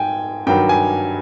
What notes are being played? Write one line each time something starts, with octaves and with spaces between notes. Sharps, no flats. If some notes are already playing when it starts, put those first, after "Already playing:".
Already playing: G#2 G5 G#5
G2 D#3 F#3 G5
G#5